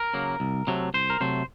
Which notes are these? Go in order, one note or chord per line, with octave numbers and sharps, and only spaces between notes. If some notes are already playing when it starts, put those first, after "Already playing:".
Already playing: A#4
C#3 F#3 A#3
C2
C3 F#3 A3
C2 C5
A#4
C3 F#3 A3 C5